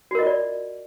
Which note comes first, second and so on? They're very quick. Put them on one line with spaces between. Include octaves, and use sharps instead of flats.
F#4 A#4 D#5 F4 D5